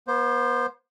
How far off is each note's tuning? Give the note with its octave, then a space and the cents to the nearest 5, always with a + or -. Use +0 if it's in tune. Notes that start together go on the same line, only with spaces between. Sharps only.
B3 -40 C5 +0